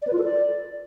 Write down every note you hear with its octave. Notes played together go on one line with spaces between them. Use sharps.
D5
B4
F4
A4
D5